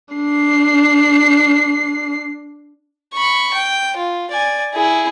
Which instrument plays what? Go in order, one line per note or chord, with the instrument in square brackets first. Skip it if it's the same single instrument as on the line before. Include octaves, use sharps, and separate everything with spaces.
[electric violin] D4 C7
[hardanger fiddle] B5 C#6
G5
F4
D5 G#5
E4 G#4